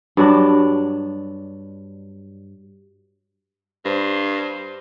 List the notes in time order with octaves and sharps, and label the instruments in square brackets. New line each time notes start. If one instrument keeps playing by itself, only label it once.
[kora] G2 F#3 D4
[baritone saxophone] G2 [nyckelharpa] C5